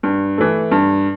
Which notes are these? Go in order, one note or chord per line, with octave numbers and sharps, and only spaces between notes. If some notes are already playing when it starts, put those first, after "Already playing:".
G2
E3 A3
G2